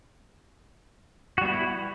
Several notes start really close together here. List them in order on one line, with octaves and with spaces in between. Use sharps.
F#4 G3 B3 E4